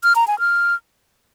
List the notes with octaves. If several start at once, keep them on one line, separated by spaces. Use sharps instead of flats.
F6
A#5
G#5
F6